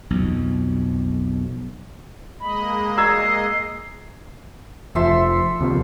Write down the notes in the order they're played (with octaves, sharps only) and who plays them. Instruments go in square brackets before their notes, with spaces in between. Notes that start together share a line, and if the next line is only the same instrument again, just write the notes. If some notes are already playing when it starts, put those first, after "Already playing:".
[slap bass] B1 F2
[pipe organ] G#3 A#3 D#5 [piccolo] B5
[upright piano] A#5 E6 G#6 [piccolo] C7
[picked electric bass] F1 F3 [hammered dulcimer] A4 E5 C6
[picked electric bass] D#2 C3 F3